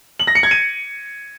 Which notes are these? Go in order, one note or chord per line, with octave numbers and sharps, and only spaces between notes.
F#7
A#6
C#7
G#6
D#7